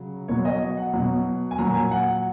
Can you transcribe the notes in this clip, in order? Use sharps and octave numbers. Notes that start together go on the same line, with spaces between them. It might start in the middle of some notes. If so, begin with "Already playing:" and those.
Already playing: C#3 F#3
B2 F#3 C#5
D#5
F#5
B2 F#3
G#5
A#2 F#3 A#5
G#5
F#5